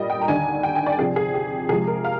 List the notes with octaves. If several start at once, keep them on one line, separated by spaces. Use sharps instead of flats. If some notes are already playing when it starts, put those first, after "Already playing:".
Already playing: A#2 G3 A#3 D4 D5 D#5
G5
A#5
D#2 D3 G3 D4 G#5
G5
G#5
D5
C3 F3 C4 G#4
G#4
G4
C3 F3 G#3 G#4
A#4
F5